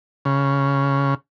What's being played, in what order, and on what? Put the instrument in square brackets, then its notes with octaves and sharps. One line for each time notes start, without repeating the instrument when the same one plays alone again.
[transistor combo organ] C#3